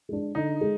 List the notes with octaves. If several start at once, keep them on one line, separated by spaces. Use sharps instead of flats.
G#3 D4
D3 D#4
G#3